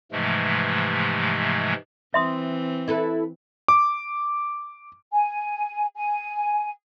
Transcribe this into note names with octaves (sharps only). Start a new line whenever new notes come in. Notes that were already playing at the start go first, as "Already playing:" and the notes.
G#2 C3 E3 F3 G#3 A3
E3 C4 E5 C6 D#6
E4 A4 B4
D6
G#5
G#5